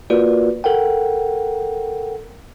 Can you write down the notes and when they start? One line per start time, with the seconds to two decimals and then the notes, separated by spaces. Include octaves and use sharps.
0.10 A#3 F4 F#4 A#4 B4 D5
0.64 A4 A#4 F#5 G5